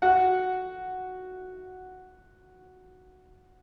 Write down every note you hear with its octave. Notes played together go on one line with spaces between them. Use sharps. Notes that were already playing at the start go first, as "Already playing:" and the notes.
F#4 F#5